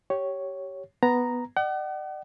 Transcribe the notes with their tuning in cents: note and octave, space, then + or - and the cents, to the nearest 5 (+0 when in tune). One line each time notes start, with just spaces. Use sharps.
G4 -15 C#5 +0
B3 +0 A#5 +0
D5 +45 F#5 +40